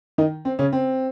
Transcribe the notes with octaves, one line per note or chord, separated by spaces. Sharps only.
D#3 D#4
C4
C#3 C#4
C4